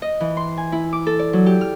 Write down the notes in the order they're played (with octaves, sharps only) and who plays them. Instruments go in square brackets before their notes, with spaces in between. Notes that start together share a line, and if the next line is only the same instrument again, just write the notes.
[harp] D#5
E3
C6
G#5
E4
D6
A4
D5
F#3
G4
F6